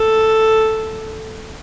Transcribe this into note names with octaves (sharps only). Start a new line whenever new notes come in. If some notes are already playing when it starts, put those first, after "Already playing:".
Already playing: A4